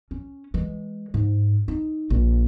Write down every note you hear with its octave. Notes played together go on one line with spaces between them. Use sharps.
C#4
E3 G#3
G#2
D#4
A#1